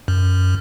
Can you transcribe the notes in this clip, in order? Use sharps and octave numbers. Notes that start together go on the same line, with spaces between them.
F#2